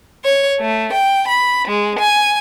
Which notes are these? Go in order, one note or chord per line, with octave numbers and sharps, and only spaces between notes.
C#5
A3
G5
B5
G#3
G#5